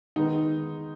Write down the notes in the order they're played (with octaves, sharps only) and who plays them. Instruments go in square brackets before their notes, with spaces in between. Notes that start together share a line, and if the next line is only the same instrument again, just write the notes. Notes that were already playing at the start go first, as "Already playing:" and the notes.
[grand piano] D#3 G#3 B3 D#4